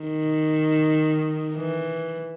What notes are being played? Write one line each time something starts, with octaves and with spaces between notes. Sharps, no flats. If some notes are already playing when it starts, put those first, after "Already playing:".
Already playing: D#3
E3